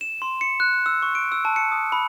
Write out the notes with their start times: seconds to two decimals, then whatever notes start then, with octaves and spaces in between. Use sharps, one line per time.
0.01 E7
0.22 C6
0.41 C#7
0.60 F#6
0.86 E6
1.02 C#6
1.15 D7
1.32 E6
1.45 A5
1.56 C#7
1.72 D#6
1.92 B5